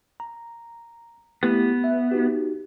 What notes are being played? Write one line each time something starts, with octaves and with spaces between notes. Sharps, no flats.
A#5
A3 B3 E4 G4
E5
D#4 F#4 G4